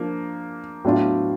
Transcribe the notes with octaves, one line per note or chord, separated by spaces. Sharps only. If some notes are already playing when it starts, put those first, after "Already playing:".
Already playing: F3 A#3 D4
A2 F#3 B3 D4 F4